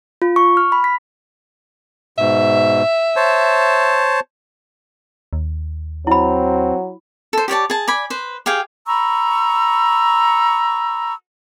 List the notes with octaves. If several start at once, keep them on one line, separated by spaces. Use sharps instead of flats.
F4
C#6
F6
B5
B6
G#2 B2 E5
C5 C#5 A5
D#2
F#3 C4 E4 B5
A4 C5
G4 C#5 D5 A5
G#4 A5
D5 G#5 B5
B4 C5
G4 G#4 F5 G5
A#5 B5 C#6 E6